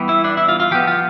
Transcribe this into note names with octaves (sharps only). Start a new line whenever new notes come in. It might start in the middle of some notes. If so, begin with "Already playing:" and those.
Already playing: E3 G3 B3
E4
D4
E4
F4
F4
F3 B3 G4
F4